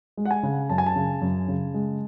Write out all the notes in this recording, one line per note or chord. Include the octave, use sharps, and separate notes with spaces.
G#3
F#5
G#5
C#3
F#2 A5
G#5
A5
C#3
F#2
C#3
G#3